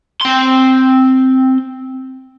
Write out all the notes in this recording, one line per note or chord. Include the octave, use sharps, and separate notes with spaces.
C4 C6